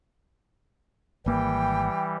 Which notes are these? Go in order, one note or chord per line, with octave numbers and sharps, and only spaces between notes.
G#1 E3 G3 A#3 G5